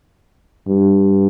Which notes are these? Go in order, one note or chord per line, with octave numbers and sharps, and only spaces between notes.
G2